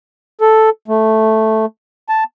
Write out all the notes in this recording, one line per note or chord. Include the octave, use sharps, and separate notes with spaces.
A4
A3
A5